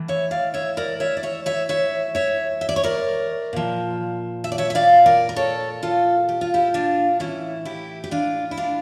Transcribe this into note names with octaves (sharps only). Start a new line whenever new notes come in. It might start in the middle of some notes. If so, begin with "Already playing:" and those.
Already playing: A2 E3
C#5 E5
D5 F5
C#5 E5
A#4 D5
C#5 E5
D5
C#5 E5
C#5 E5
C#5 E5
C#5 E5
E5
D5
C#5
A#4 D5
A#2 F3
E5
D5
C#5 E5
E5
D5 F5
A#4 D5
A#4
A4 C#5
F4 A4
G4
F4
E4 G4
D4 F4
A2 E3 C#4 E4
E4 G4
G4
D4 F4
E4
D4 F4